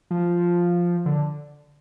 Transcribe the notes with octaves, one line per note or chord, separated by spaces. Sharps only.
F3
D3